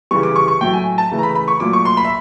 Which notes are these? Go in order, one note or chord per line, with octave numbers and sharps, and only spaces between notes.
C#3 E3 G3 C#6
D6
C#6
C#6
A2 F#3 A3 G5
G#5
A5
C#3 E3 A3
A#5
B5
B5
C#6
A#2 F#3 A3 D6
C#6
C6
B5
E5